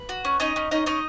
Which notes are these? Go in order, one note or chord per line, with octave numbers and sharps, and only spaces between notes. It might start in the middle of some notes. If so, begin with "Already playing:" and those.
Already playing: B4
F#4
C#4
C#4 D#4 D#5
C#4
C#4 D#4 D#5
C#4 D#4 D#5